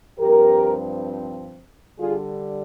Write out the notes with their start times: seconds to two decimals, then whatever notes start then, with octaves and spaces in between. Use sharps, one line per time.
0.19 G2 F3 C4 G4 A#4
2.00 D3 G3 D4 F4 G#4